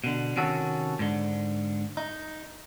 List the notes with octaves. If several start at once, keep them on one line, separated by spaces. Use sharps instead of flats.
B2 D3
C3 D#3 C#4 F#4 A4
G#2 D3
D#4